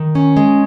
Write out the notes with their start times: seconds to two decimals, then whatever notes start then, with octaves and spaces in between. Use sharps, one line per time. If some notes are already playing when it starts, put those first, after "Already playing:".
Already playing: D#3
0.15 C#4
0.37 G#3